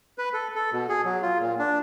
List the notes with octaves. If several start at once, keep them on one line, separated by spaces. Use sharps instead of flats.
B4
A4
A4
B2
G#4
F#3
F4
A#2
D4